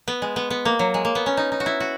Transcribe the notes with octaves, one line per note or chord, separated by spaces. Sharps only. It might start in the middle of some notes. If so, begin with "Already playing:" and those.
B3
G#3
B3
B3
A#3
F#3
G#3
A#3
B3
C#4
D#4
D#4
F#4
E4
F#4